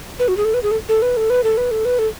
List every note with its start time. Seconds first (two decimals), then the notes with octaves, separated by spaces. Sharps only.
0.19 B4
0.28 F#4
0.37 G#4
0.45 A4
0.54 B4
0.63 G#4
0.71 A4
0.89 A4
1.02 B4
1.17 A4
1.30 B4
1.44 A4
1.57 B4
1.71 A4
1.85 B4
1.99 A4